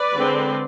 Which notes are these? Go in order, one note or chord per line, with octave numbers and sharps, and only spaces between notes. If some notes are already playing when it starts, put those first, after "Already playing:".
Already playing: B4 D5
D3 G#3 C4